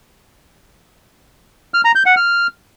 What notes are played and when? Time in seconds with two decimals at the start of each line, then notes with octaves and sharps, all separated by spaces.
1.74 F6
1.85 A#5
1.95 G6
2.06 F#5
2.17 F6